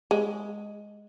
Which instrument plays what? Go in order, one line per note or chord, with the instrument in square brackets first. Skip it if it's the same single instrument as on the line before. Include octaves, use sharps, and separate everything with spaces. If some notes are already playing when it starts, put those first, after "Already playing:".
[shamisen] G#3